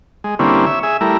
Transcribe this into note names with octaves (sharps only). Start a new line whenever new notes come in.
G#3
D3 G3 A#3 C4 C#4 E4
C#5 E5
G#4 E5
G3 A3 E4 A#4